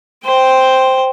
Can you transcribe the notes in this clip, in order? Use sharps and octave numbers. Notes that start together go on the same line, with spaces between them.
C5 G5